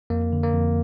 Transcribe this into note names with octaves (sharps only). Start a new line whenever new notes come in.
F2 A#3
D3
A#3
F2